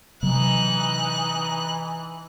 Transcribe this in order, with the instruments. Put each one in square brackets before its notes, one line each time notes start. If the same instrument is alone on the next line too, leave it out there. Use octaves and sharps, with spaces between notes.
[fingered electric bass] C3 F#3 [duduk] E3 [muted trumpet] D#4 [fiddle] F#6